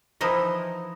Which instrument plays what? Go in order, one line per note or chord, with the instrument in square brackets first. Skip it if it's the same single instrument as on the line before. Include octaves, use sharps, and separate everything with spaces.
[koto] E3 F3 D#4 E4